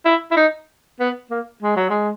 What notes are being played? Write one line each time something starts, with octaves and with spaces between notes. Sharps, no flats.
E4
E4
D#4
B3
A#3
G#3
F#3
G#3